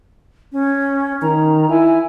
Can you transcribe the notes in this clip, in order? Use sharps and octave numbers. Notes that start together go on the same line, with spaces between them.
C#4
D#3 A#5
E4 G#5